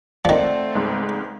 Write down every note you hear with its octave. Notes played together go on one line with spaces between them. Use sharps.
D#3 F3 A3 C4 D5 F#5
C#2 G#2